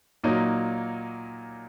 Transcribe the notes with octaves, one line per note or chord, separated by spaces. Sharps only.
A#2 F#3 A#3 D#4